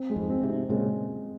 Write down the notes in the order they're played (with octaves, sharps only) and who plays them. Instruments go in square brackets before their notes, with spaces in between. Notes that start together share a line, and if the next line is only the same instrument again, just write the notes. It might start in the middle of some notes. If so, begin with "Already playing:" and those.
Already playing: [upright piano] C4
G#3
[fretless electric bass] F2 G#2
[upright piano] C4
[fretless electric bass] G#2 C3
[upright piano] C4
[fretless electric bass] A#2 C#3 [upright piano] G#3